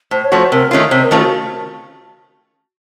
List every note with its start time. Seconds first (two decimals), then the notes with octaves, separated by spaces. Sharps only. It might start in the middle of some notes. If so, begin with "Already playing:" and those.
0.11 A2 C5
0.24 C#5
0.32 F3 A3 C#4 F#4
0.39 C5
0.52 C3 A#4
0.71 D#3 A3 C#4 F4 C#5
0.91 C3 C5
1.04 A#4
1.11 D#3 A3 C#4 F4
1.19 F#4